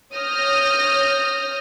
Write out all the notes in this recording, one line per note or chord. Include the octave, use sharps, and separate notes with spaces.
C#5 D#6 F6 G6 A#6